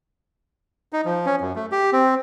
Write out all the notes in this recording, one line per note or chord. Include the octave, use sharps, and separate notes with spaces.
D#4
F3
C#4
F#2
A3
G4
C4